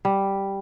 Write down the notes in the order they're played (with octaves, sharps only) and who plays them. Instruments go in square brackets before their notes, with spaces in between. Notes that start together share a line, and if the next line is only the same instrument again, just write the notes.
[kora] G3